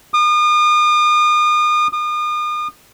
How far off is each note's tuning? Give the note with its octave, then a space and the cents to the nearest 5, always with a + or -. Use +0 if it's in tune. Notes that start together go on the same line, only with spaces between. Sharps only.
D#6 -40
D#6 -40